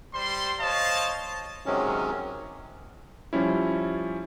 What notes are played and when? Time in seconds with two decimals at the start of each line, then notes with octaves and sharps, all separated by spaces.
0.14 G3 C5 C6
0.59 C5 C#5 D#5 F5 A5
1.66 C3 D#3 F#3 G#3 C#4
3.33 F3 G3 C#4 E4